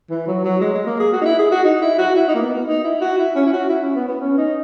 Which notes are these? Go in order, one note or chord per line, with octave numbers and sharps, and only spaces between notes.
E3
F#3
F#3
G#3
G#3
A#3
G#4
F#4
D#4
E4
G#4
F#4
D#4
E4
F#4
E4
D#4
A#3
B3
D#4
E4
F#4
E4
C#4
E4
F#4
E4
C#4
B3
B3
C#4
D#4